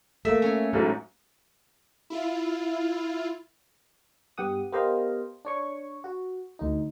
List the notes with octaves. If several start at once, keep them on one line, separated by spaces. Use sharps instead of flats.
A3 A#3 E5
C#4 G#5
A1 G#2 F#3 A3
E4 F4
G2 B3 G4 F#5 D#6
B3 G4 A#4 C5 D#5 F5
D4 C#5 C#6
F#4
D2 D#4